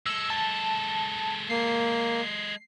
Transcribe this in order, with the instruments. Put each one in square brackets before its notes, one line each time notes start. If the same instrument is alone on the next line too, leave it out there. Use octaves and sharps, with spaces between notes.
[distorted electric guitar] G#3 A4 [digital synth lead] E6
[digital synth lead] A5
[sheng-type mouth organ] A#3 [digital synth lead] C7